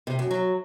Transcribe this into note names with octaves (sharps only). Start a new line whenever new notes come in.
C3
F#2
F#3